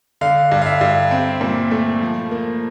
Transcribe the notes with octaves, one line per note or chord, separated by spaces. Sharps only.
D3 F5
G2
F5
E5
G2
C4
A#2
A3
F3
A#3